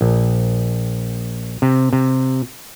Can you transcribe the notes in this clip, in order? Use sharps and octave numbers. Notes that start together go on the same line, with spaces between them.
A#1
C3
C3